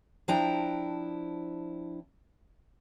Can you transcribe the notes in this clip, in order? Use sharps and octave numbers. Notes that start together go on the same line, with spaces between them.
F3 D4 E4 G5 A#5